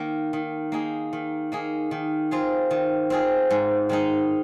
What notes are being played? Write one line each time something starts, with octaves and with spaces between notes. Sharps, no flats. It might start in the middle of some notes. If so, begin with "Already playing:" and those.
Already playing: D#3 A#3
D#3
A#3 D#4 G#4
D#3
A#3 D#4 G#4
D#3
C4 F4 G#4
D#3
C4 F4 G#4
G#2
D#3 G#3 D#4